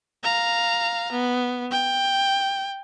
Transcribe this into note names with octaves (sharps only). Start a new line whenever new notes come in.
F5 A#5
B3
G5